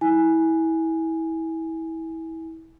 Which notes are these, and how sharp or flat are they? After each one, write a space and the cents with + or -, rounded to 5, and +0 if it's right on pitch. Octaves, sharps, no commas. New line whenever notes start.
E4 -25 G#5 +0